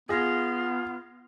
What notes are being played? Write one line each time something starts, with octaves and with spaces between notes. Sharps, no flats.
B3 F4 G#4 A#6